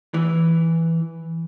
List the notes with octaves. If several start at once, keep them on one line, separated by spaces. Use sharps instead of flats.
E3